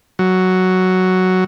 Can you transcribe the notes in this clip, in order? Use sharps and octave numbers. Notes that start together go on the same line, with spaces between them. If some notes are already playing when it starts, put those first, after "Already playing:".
F#3